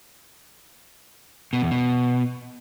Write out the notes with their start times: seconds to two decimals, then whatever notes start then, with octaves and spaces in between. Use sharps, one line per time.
1.53 B2
1.62 E2
1.71 B2